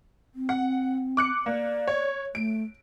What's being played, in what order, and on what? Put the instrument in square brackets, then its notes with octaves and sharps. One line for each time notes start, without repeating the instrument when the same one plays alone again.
[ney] C4
[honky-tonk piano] F#5
D6 F#6 C#7
[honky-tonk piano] A#3 [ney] D5
[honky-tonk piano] C#5
[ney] A3 [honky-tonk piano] D7